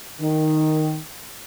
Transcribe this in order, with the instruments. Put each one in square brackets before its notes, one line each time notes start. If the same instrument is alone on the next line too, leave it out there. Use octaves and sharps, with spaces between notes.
[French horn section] D#3